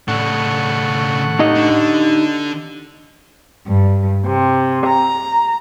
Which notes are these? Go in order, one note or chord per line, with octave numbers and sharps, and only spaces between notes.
A2 C#3 D4 F#5 C#6
D#4 G4 D#5
D3 D4
G2
C3
A#5